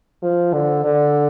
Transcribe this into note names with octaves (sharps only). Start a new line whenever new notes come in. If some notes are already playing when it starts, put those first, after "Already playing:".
F3
D3
D3